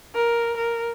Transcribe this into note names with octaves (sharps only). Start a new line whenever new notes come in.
A#4
A#4